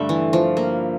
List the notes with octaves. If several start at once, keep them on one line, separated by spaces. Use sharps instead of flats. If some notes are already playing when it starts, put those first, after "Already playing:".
Already playing: G2 D3 G3 A3
E3
F3
A#3